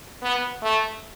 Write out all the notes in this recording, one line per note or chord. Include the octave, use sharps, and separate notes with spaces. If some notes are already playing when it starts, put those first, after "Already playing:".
B3
A3